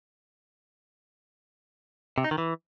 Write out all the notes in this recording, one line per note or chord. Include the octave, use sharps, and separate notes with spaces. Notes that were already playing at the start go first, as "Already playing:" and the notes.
C3
D#4
D#3
E3